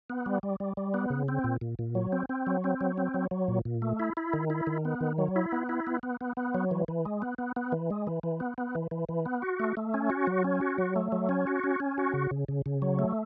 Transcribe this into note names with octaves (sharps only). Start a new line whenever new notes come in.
B3
G3
G3
G3
G3
B3
C#3
C4
A#2
A#2
A#2
F#3
C4
C4
F#3
C4
F#3
C4
F#3
F#3
A#2
A#2
A3
E4
E4
D#3
E4
D#3
B3
D#3
F#3
E4
B3
E4
B3
B3
B3
B3
F#3
E3
E3
G#3
B3
B3
B3
E3
G#3
E3
E3
B3
B3
E3
E3
E3
B3
F#4
A3
A3
C#4
F#4
F#3
C#4
F#4
F#3
A3
F#3
C#4
F#4
C#4
C#4
F#4
C#3
C#3
C#3
C#3
F#3
A3